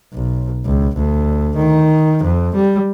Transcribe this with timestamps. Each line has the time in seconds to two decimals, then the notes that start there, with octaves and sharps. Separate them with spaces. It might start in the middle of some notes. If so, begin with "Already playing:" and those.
0.13 B1
0.65 C#2
0.97 D2
1.56 D#3
2.24 F2
2.55 G3